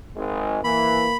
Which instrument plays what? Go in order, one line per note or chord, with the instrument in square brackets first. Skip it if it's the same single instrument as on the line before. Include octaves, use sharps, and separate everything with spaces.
[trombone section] G#1 G#3
[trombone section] E3 [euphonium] A#3 [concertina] B5